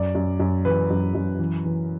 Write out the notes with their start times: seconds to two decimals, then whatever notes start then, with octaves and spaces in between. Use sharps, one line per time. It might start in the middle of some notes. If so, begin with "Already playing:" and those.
Already playing: F#2 D5
0.15 F#2
0.40 F#2
0.65 E3 B4
0.90 F#2
1.15 F#2
1.39 E3
1.64 E3